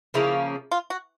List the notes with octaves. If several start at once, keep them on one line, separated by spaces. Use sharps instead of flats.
C#3 F3 A#3 C#4 E4
F4
F#4